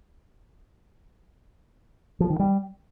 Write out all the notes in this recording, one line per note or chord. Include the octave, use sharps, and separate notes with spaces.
F3
D#3
G3